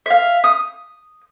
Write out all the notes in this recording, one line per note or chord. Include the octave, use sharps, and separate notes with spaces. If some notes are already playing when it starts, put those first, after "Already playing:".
E5 F5
D#6